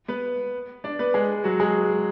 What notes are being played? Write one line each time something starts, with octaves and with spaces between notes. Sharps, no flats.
B3 B4
D4 D5
B3 B4
G#3 G#4
F#3 F#4
G#3 G#4